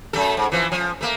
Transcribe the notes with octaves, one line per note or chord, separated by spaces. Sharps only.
F#2 A3 A4
G#2
E3 F3
F3
A3 A#3